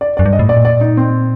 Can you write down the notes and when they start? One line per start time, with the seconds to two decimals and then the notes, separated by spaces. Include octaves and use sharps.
0.01 D5
0.17 F#2 D5
0.26 G2
0.33 D#5
0.39 A2
0.48 A#2 D5
0.65 D5
0.81 D#4
0.97 C4